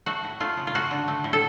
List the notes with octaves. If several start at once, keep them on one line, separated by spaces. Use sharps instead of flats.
A3 F#4
A2
A3 F4
C#3
F4
A3 F#4
D3
A3
A2
A4